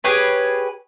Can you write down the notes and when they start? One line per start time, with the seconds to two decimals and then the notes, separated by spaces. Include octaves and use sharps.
0.04 G4 G#4 B4 C#5